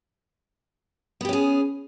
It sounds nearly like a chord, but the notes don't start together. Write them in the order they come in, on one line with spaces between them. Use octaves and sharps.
B3 G4 C#4 G#4